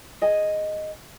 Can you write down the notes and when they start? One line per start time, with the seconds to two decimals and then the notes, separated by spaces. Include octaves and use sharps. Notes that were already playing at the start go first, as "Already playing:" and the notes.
0.22 G#4 D#5 G#5